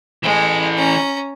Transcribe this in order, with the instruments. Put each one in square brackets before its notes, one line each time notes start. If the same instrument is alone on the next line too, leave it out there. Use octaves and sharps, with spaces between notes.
[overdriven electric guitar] E3 A4 [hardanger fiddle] G#3
[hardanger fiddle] C#4 A#5